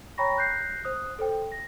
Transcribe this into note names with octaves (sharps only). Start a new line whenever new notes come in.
C#5 G5 A#5 B5 C#6 A#6
F#6 G6 A#6 C7
C5 D#6 F#6
A4 C5 G5
A#6